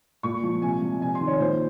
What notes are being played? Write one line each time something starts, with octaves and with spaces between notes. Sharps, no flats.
A#2 C#6
F3
C3 G#5
F3
C3 G#5
C6
D#3
C#5
A#2 C5